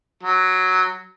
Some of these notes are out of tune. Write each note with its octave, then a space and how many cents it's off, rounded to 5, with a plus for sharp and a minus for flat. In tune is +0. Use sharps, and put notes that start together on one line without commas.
F#3 +0